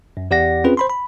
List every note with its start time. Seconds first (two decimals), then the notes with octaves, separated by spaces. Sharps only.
0.17 F#2
0.31 E2 G4 D5 F#5 A#6
0.64 C4 C#4 F4 G#4 B4
0.77 C5 B5 C6
0.90 B5